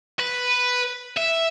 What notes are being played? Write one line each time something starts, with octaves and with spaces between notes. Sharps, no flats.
B4
E5